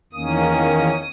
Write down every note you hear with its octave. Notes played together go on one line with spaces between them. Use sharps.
E2 D#3 A#3 C#4 D#6